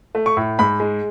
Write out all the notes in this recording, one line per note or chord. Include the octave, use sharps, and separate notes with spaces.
A3
C#6
A2
G#2 B5
G#3